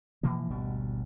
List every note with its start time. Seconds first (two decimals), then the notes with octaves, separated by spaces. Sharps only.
0.23 B2 E3 F3 A#3
0.50 G#1 D2 B2 G3